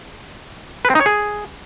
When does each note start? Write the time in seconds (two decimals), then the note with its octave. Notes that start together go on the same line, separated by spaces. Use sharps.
0.85 B4
0.90 C4
0.95 D#4
1.01 C#5
1.06 G#4